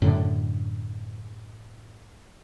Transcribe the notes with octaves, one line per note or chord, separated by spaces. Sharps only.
F#2 A2 D3